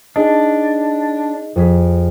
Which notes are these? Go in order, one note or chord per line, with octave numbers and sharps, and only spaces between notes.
D4 D#4 G#4 D#5
F2 G#4 B6